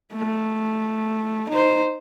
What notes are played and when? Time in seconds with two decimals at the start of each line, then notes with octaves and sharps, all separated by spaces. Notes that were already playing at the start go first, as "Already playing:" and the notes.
0.13 A3
1.49 D#4 C5